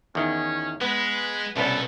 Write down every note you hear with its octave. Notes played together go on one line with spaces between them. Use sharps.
E2 D#3 C#4
G#3 B3 B4
C2 B2 B3 C#4 A4